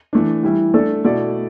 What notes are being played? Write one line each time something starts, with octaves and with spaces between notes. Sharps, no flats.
E3 A3 D4
E3 G3 E4
A3 D4 A4 D5
B2 A3 E4 A4 D5